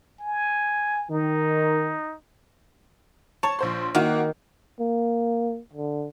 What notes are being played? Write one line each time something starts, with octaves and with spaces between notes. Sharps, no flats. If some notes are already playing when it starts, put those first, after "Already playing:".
G#5
D#3 D#4
C#5 A5
A#1 C5 C6
D#3 A#3 E4 F#4
A#3
D3